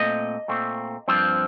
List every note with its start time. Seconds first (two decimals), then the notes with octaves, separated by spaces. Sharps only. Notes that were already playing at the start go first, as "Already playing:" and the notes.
Already playing: A#2 A3 C4 D#5
0.48 A#2 A3 C4
1.08 G2 F3 C4